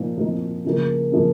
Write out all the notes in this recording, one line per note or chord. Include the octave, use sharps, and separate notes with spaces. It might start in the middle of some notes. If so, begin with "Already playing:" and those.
Already playing: A#2 F3 C4 D#4
A#2 F3 C4 D#4
C#3 F3 A#3
C#3 F3 A#3